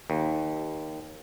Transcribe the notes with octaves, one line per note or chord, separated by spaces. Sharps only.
D#2